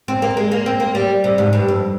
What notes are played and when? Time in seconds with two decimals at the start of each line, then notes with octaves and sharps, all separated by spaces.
0.08 C4
0.22 A#3
0.37 G#3
0.52 A#3
0.66 C4
0.80 A#3
0.95 G3
1.24 C3
1.38 G#2
1.53 G2
1.68 F2